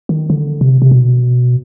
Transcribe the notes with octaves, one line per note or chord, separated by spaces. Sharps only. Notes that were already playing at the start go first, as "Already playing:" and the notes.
D#3
D3
C3
C3
B2